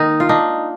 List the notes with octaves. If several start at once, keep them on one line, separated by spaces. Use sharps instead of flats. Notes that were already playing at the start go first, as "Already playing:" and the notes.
Already playing: D#3 A#3 D#4
F4
D4 D#4